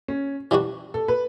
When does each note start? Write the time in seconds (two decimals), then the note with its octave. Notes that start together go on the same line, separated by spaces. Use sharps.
0.08 C#4
0.51 E3 G3 D4 F#4
0.94 A4
1.08 B4